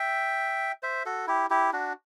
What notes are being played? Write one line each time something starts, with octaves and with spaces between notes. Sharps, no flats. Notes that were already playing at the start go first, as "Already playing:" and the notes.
Already playing: E5 G5
C5 E5
F#4 A4
E4 G4
E4 G4
D4 F#4